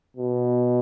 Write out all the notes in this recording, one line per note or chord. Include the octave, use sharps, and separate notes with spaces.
B2